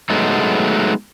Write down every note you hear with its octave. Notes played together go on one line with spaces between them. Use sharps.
F#3 G#3 A3 B3 D#4